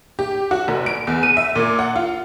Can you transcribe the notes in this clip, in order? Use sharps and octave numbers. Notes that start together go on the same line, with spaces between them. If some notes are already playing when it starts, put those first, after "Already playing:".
G4
F#4
F1
D7
E2
D#7
E5
A#2
F#5
F4